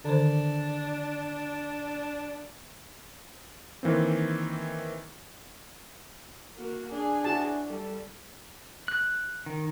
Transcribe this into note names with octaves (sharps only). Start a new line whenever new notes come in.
D3 D#3 D4 C5
D#3 E3 A#3 C4
A#3 F#4
D4 G#4
E4 F#4 A5
G3 A4
F#6
D#3